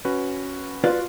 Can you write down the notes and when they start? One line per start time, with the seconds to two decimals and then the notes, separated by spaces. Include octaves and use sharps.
0.05 C#4 F#4 B4
0.84 F4 F#4 B4 D5